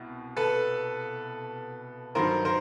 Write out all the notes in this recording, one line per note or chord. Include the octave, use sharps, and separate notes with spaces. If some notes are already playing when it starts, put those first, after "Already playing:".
Already playing: C2 B2
A4 B4
G2 D#3 F#3 A#4 C5
A#4 C5